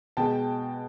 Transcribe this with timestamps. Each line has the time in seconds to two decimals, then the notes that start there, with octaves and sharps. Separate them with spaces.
0.17 B2 G#3 G5 A5